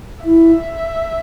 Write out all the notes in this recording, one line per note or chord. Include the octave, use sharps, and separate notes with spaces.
E4 E5